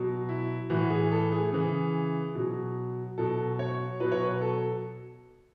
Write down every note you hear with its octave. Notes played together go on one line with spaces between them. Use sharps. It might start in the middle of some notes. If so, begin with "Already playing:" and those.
Already playing: B2 F#3
E4
A2 E3 F#4
G#4
A4
G#4
C#3 E3 G#4
B2 F#3
B2 F#3 A4
C#5
B2 F#3 B4
C#5
B4
A4